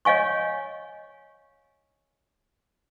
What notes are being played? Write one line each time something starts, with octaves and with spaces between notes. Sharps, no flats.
C#5 D#5 F5 G#5 C#6